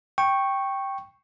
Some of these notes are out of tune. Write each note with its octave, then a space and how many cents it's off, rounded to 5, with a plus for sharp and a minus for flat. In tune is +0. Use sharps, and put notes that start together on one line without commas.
G5 +0 C#6 -10